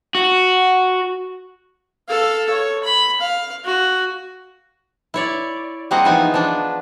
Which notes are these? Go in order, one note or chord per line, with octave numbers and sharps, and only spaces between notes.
F#4
A4 F5
C#5
B5
F5
F#4
E4 C#5 D5
G3 A#3 C4 G#4 D#5 F#5
E3 F3 B3 D#4 G#5
F3 D4